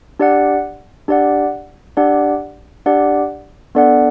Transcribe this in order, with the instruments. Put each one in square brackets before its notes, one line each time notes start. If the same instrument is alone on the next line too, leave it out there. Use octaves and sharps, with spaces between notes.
[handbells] D4 G4 D5 F#5
D4 G4 D5 F#5
D4 G4 D5 F#5
D4 G4 D5 F#5
B3 D4 A4 D5 F#5